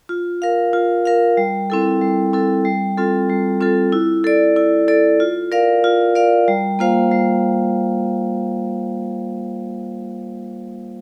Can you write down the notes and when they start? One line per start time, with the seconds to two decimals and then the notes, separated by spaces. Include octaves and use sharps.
0.09 F4
0.42 A#4 F5
0.73 F4
1.05 A#4 F5
1.37 G3
1.70 C4 E4 A4
2.02 G3
2.33 C4 E4 A4
2.65 G3
2.97 C4 F4 A4
3.29 G3
3.61 C4 F4 A4
3.93 E4
4.24 A4 D5
4.56 E4
4.88 A4 D5
5.20 F4
5.52 A#4 D5 F5
5.84 F4
6.15 A#4 D5 F5
6.48 G3
6.79 A#3 F4 C5 F5
7.11 G3